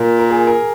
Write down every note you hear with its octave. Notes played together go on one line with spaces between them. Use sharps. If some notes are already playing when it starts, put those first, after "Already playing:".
Already playing: A#2 A#4
A#4
G#4
A#4